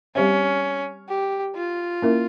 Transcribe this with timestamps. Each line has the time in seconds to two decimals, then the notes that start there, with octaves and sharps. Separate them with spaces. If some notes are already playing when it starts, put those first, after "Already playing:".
0.15 G3 C4 C#4 G4 C5 E5
1.09 G4
1.55 F4
2.02 A#3 C#4 E4 A#4 E5